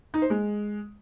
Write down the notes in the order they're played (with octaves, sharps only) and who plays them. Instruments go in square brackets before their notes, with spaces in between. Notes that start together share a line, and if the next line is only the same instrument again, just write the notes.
[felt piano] D#4
C5
G#3